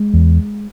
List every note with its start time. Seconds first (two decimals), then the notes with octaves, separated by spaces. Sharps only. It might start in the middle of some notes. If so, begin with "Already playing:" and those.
Already playing: G#3
0.14 E2